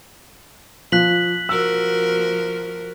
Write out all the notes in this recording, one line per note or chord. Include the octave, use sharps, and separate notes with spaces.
F3 F#6 B6 F#7
F3 F#4 A#4 E6